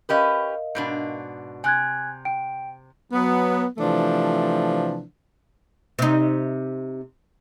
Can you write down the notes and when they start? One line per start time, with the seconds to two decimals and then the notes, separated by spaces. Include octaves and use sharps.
0.09 C#4 G4 A#4 B4 D#5 F5
0.75 G#2 B2 D4
1.64 C3 G#5 F#6 G#6
2.25 G5 D7
3.12 F#3 B3
3.78 C3 E3 F3 A3 D4
5.99 C3 D#4